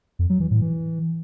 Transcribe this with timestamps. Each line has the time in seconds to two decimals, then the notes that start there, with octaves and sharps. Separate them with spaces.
0.19 F2
0.30 F#3
0.40 E3
0.51 A2
0.61 E3